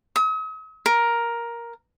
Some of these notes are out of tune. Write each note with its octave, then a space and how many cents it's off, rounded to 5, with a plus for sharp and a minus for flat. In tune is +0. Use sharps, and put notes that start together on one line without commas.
D#6 +45
A#4 +10